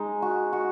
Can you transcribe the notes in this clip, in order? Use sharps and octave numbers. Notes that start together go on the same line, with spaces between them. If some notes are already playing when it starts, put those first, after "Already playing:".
Already playing: G#3 D#4
F#4
F#4